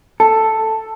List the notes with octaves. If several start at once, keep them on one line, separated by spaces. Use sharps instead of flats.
A4